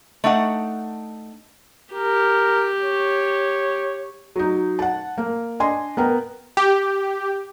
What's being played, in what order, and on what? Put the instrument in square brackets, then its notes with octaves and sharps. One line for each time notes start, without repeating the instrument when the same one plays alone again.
[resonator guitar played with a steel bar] A3 D4 D#4 F#5
[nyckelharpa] G4 [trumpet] A#4
[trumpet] C#5
[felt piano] F#3 D#4
F#5 A5
A#3
D4 D#5 G#5 C6
B3 A#4 G5
[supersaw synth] G4